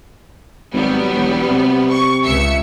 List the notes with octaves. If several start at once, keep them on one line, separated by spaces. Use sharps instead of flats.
G#1 F#3 G3 B3
E1
C3
C#6
C#2 E5 C#7